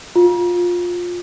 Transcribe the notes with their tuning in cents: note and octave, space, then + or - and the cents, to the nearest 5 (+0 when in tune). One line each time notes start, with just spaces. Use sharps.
F4 +15